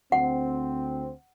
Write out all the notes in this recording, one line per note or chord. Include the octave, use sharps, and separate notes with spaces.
D2 C4 F#5